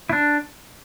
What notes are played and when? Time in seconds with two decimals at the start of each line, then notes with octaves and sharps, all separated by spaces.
0.09 E4
0.13 D4